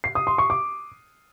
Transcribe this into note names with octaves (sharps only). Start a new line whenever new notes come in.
C7
D#6
C6
C#6
D6